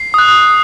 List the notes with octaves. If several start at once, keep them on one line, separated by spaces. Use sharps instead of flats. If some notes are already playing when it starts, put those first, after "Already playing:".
Already playing: C7
D#6 F#6